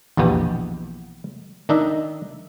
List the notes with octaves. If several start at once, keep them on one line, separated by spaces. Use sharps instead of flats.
A#1 E2 B2 B3 G4
D#3 D4 D#4 D#5 E5